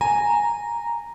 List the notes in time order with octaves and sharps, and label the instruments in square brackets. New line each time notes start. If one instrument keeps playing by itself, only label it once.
[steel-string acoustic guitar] G#5 [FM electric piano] A#5